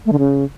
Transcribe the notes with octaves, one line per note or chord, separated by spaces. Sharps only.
A3
D3
C#3